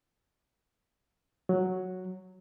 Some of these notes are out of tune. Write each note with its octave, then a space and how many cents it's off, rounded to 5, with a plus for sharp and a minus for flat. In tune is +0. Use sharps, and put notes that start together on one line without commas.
F#3 +0